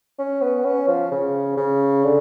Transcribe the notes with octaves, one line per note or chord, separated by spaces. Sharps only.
C#4
B3
C#4
F3
C#3
C#3
D3